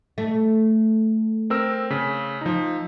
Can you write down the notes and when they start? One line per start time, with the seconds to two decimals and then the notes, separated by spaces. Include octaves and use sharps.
0.18 A3
1.50 C4 A#4 E6
1.90 C#3 B6
2.41 F3 D#4